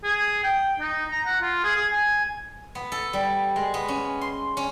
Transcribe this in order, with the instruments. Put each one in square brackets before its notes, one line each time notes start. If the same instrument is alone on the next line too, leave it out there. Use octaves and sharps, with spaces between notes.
[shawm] G#4
G5
D#4
A#5
F#5
F4
G#4
G#4
G#5
[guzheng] B3
A4
G3
G#3
B3
C#4
C6
C#4